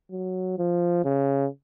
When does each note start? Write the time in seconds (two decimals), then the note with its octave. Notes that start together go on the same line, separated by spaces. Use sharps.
0.11 F#3
0.58 F3
1.05 C#3